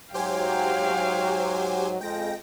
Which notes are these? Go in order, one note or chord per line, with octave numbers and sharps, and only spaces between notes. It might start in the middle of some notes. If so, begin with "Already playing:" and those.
G#2 F#3 G4 C5 F5 G5 G#5
F2 G#3 G5 A#6